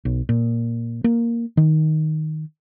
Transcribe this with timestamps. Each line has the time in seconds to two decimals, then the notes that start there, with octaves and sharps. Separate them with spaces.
0.05 B1
0.29 A#2
1.04 A#3
1.57 D#3